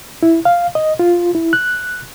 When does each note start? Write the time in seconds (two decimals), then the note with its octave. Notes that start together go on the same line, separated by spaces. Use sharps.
0.23 E4
0.45 F5
0.75 D#5
0.99 F4
1.35 E4
1.53 F#6